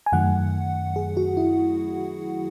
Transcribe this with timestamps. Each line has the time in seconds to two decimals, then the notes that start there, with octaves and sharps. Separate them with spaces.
0.06 G#5
0.12 F#2 D#3 F#3 A3 F#5
0.96 G#4
1.17 F#4
1.37 E4